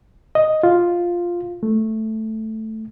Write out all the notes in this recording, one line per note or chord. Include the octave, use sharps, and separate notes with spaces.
D#5
F4
A3